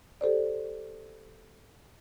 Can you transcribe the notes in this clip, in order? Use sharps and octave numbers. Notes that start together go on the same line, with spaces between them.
G4 A4 C5 D5